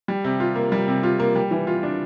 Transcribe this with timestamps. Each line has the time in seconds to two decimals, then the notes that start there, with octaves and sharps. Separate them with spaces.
0.08 G3
0.24 C3
0.40 F4
0.56 A#3
0.72 G3
0.88 C3
1.03 F4
1.20 A#3
1.36 G3
1.51 E3
1.67 F4
1.83 D4